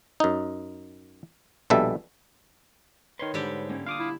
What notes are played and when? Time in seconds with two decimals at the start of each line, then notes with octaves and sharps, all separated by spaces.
0.20 F#2 D#4
1.70 A#1 B2 G3 A4 E5
3.19 D#3 B4 C#5 C6
3.34 G#2 D3 G3 G4
3.69 A#3 C#4
3.86 A#3 D4 F4 F5 D6 D#6
4.00 E4